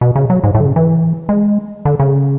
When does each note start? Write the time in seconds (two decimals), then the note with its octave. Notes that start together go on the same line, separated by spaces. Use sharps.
0.01 B2
0.16 C#3
0.30 F#3
0.44 G#2
0.55 A2
0.60 D3
0.65 C#3
0.76 E3
1.29 G#3
1.85 D3
2.00 C#3